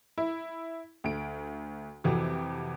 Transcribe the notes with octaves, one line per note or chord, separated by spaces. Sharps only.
E4
D2 D7
F2 C3 E3 F#4